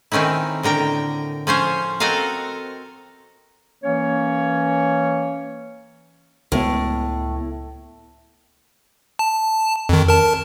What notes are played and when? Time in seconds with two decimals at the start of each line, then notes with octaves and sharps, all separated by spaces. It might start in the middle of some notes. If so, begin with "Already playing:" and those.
0.12 D#3 C4 C#4 D#4 E4
0.63 A2 D3 A#4 G5
1.47 F3 C#4 C5 C#5
2.00 C4 F#4 A4 A#4 D#5 F5
3.83 E3 A#3 C#4 C#5
6.52 C#2 A2 G#3 B3
9.19 A5
9.89 F2 D#3
10.08 A#4 A5